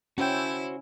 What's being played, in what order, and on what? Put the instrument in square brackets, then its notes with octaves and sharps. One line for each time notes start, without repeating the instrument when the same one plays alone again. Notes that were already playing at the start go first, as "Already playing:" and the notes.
[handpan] C#4 [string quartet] E4 [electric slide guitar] F#4 C5 [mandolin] A4 G5